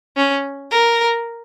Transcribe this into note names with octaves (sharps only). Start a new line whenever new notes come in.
C#4
A#4